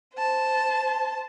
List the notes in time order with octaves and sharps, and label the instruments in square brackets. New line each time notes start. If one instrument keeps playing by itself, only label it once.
[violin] C5 A5